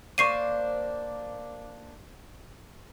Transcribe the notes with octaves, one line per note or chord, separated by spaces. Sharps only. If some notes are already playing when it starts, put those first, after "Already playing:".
A#3 D4 C5 C#6 C7 D#7